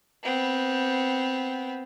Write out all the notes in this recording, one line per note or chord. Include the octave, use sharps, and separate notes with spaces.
B3 C4